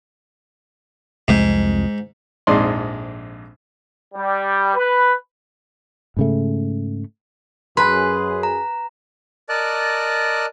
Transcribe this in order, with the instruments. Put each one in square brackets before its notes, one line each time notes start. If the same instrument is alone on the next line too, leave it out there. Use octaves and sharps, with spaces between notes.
[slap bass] C2 F2 G#3 [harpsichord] G#2
[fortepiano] A#1 F2 G#2 D#4 D5 C6
[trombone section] G3
B4
[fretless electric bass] G#2 C#3 A3
[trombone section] F#2 G#4 [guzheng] B4 [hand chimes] C6
[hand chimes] A#5
[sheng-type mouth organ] A#4 D5 D#5 A5 D6 F#6